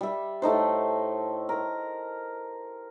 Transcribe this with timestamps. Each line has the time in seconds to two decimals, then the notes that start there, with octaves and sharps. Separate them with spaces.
0.01 G3 E5
0.42 A2 A3 D#4 C5
1.49 A#4